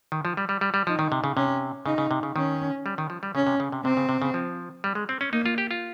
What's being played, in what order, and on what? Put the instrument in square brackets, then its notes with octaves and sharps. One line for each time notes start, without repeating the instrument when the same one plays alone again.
[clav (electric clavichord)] D#3
F3
G3
G3
G3
G3
[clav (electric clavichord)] F3 [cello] D#4
[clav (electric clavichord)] D#3
C3
C#3
[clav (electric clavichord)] C3 [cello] C#4
[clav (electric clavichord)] C#3 [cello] D#4
[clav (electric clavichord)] C#3
C3
C#3
[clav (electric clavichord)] D#3 [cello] C#4
[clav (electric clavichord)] G3
D#3
F3
G3
[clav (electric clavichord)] C#3 [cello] C#4
[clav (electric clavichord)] C3
C#3
C3
[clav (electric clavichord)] C3 [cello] C4
[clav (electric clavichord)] C#3
C3
C#3
F3
G3
G#3
C4
C#4
[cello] A#3 [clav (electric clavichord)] D#4
[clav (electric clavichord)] F4
G4
F4